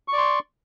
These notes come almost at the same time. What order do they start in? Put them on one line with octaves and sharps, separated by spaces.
C#6 D5 C6